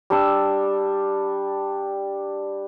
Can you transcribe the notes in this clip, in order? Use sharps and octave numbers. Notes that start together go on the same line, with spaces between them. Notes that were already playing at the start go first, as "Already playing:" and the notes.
G3 D4 E6